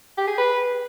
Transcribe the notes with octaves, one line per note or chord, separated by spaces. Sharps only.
G4
G#4
B4